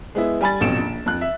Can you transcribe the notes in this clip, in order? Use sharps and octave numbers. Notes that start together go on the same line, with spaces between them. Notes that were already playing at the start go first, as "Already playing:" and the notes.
G#3 B3 E4
G3 G#5 B5 A6
A1 F2 B2 D7 E7
A#1
F2 F#6
E5